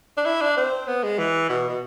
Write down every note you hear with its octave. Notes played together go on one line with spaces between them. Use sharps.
D4
E4
D4
C4
B3
G#3
E3
B2
B2